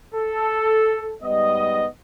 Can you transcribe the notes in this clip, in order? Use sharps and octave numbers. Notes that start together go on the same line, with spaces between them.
A4
G#2 G3 B3 D#5